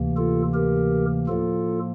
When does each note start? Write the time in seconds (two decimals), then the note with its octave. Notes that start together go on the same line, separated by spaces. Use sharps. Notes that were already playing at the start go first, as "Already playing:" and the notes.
Already playing: D2 C3 E3 A#3
0.17 F4 A4
0.54 G4 A#4
1.27 A2 F3 A#3 F4 A4